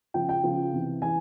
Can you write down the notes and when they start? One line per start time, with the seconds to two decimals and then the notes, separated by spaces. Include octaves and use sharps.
0.14 C#3 F3 G5
0.29 G5
0.44 C#3 F3
0.73 C3 E3
1.02 E3 G#5